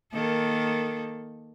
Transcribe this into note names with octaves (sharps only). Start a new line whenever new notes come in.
D#3 A#3 A4